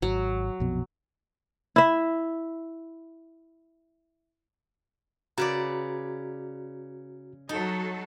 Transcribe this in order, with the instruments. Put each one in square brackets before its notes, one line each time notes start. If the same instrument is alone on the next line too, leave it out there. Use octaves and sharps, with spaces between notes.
[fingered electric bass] G#1 [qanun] F#3
[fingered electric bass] A#1 F2 B2
[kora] E4 E5
[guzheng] C#3 B4 D5 [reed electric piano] F#4 A#5
[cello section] F#3 F#4 A4 [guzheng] D#4